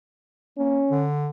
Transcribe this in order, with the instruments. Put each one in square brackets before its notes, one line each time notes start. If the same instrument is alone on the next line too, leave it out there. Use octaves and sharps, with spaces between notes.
[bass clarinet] A#3 [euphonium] C#4
[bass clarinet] D3